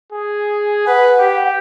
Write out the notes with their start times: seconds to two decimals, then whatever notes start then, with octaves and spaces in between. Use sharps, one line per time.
0.12 G#4
0.87 B4 F#5
1.19 G4